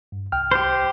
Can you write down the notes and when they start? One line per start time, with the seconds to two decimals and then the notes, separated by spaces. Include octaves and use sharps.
0.12 G2
0.32 C2 G5 F6
0.52 G4 C5